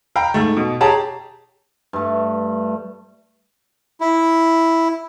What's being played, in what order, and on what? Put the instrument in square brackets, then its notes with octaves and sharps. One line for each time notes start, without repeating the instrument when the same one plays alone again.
[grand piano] F5 G5 A#5 B5
G#2 A3
B2
G4 G#4 C#5 A5 A#5
[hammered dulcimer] G2 A3
[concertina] E4